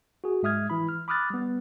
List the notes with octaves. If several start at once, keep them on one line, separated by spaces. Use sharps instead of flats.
F#4 G#4
G#2 G#3 E5 D#6 F6 G#6
E3 E4 B5
F6
B5 D6 D#6 F6 F#6 A6
G3 B3